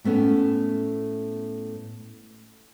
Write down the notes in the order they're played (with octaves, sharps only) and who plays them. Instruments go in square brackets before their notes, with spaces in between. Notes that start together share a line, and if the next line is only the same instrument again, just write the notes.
[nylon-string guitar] A2 A3 B3 C#4